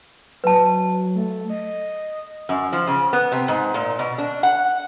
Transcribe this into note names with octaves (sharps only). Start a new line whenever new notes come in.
F#3 B4 A5
A3
D#5
F#2
F3
C#3
B3
C3
G#2
A#2
B2
D4
F#5